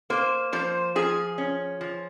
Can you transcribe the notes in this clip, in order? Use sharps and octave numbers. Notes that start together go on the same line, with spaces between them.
A#3 C5
F3 C5
F3 G#4
C#4
F3